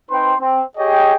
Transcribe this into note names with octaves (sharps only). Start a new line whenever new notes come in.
C4 D#4 B4 C5 G5 C6
C4
G4 G#4 C#5 D#5 G5